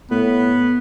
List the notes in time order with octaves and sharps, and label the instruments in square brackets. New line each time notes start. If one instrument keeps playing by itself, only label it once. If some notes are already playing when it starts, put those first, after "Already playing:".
[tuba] A2 [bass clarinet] B3